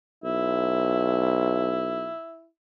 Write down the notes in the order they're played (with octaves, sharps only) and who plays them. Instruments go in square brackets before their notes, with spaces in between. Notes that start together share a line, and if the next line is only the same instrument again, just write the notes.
[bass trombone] B1 [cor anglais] E4